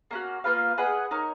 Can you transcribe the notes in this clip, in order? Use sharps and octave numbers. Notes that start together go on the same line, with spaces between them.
A#3 C#4 F#4
A#3 F4 B4 F5
G#4 B4 D#5 F#5
D#4 A#4 C#5